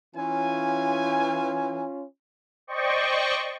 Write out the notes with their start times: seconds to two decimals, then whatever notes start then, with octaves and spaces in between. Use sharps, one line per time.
0.16 E3 C#4 F4 G#5
2.67 C5 D5 D#5 G5 C#6